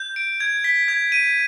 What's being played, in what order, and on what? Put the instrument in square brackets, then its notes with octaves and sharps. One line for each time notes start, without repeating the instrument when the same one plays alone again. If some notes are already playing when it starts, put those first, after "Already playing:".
Already playing: [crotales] G6
D7
G#6
B6
G#6
D#7